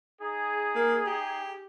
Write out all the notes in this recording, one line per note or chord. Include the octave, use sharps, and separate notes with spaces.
D#4 G#4
A#3
G4